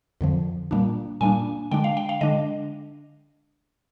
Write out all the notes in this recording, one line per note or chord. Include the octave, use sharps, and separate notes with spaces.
F2 D3 F3
A#2 G3 A#3 D4
A#2 G3 A#3 D4 G#5
D3 G#3 D4 G5
F5
G5
F5
D3 G#3 D4 D#5